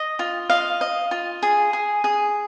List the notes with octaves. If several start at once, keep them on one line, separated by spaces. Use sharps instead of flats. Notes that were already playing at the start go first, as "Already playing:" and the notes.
Already playing: D#5
F4
D#5 F5
D#5
F4
G#4
G#4
G#4